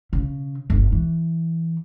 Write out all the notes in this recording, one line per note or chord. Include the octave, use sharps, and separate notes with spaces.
C#3
G1
E3